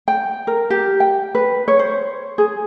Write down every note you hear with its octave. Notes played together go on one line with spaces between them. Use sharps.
G5
A#4
G4
G5
B4
C#5
C5
G#4